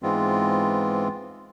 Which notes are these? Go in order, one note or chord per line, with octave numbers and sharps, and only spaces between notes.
G#2 E3 G#3 B3 C4 F4